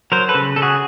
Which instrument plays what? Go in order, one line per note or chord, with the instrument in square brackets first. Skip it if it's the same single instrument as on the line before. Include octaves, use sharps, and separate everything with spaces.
[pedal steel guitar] F#3 A#4 C5
A4 B4
C#3
C#3 A4
F#4 G#4